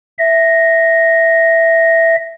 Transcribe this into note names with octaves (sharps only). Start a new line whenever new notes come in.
E5 A#6